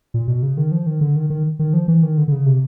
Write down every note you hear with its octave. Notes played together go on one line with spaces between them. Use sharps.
A#2
B2
C#3
D#3
F3
D#3
D3
D#3
D#3
D#3
F3
E3
D#3
D3
D3
C#3
C3